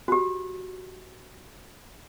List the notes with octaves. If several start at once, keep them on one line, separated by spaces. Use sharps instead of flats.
F#4 G4